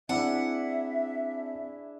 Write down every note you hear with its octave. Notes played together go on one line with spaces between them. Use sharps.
C4 D4 E4 G#4 E5 F#5